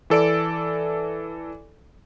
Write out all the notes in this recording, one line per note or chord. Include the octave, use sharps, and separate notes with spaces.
E3 A4 D5 D7